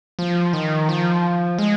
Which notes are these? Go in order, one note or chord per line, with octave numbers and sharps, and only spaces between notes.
F3
D#3
F3
G#3